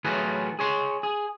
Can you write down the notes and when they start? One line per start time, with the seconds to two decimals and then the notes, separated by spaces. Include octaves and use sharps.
0.04 A2 E3 F#3 F4 G#4 B4
0.59 G#4 C#5 C6
1.03 G#4